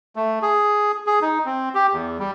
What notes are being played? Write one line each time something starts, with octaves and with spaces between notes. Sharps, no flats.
A3
G#4
G#4
D#4
C4
G4
E2
G3